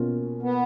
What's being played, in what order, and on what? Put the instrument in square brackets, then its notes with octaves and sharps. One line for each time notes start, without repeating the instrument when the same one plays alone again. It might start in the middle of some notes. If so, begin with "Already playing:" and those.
Already playing: [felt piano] B2 A#3 C#4 F4
[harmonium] B3